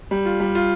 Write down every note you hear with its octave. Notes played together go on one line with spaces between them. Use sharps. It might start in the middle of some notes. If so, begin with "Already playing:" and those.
G3
F4
G3
F4